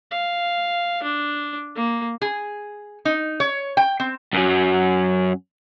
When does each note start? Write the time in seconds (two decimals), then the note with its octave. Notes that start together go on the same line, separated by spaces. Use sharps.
0.11 F5
1.03 D4
1.76 A#3
2.22 G#4
3.05 D#4
3.40 C#5
3.77 G5
4.00 C4
4.33 F#2 F#3